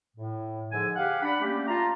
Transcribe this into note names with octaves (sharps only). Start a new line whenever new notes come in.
A2
G#2 D3 F3 G#5
G4 F5 F#5
D4 F#5 B5
G3 A3 A#3 C#4 G4
F4 A5 A#5